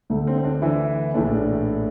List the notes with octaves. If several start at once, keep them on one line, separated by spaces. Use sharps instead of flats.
D2 D3 A3
C4
C4
D4
E3 E4
A#1 A2 E3 A3 D4